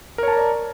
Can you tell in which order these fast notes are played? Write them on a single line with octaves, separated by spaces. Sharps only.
A#4 C#5 A5 A#5 D5